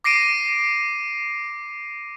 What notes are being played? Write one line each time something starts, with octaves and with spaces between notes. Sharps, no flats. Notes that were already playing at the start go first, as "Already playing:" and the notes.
D6 A#6 C7 D7 D#7